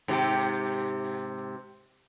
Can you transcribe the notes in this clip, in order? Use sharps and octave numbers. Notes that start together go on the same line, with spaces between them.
G#2 C3 G4